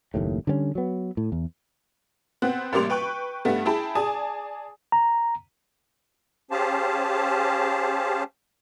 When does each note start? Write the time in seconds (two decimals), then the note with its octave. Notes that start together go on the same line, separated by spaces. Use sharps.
0.14 F#1 D#2 A2
0.47 D3 G3 B3 C#4
0.75 F#3 B3
1.17 A2
1.32 E2
2.42 B3 C4 F#6
2.73 A1 G3 A#3 C6 D6 F7
2.90 B4 G5 C#6 F#6
3.45 G2 G3 A3 B3
3.65 E4 G#4 G5 A5 B5
3.95 G#4 D5 G#5 A5 D#6
4.92 A#5
6.51 C#4 G4 G#4 C5 F5 A5